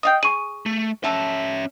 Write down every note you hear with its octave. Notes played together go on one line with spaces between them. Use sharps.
D#5 F5 G5 D#6
G#4 C#6 D#7
A3
F#3 A3 C#4 A4 E5